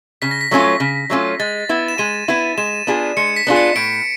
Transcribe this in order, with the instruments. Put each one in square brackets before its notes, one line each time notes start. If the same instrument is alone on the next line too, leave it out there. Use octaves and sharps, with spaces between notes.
[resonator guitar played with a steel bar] C#3 [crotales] B6
[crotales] A#6
B6
[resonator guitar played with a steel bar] F#3 A3 C#4 F4
C#3
F#3 A3 C#4 F4
[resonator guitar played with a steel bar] G#3 [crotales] A6
[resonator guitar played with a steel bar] B3 E4
[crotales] E7
[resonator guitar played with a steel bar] G#3 [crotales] D#7
[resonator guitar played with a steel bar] B3 E4
[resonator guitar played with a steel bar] G#3 [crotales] E7
[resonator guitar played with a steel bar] B3 D4 F4 G#4
[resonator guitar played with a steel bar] G#3 [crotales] C#7
[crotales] B6
[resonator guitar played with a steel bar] B3 D4 F4 G#4
[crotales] C#7
[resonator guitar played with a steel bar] A2 [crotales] D7